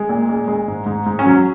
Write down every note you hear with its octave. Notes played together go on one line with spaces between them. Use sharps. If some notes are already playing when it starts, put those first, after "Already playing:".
Already playing: G#3
A#2
G#3
G#3
G#2
G#2
G#2
C#4
F#3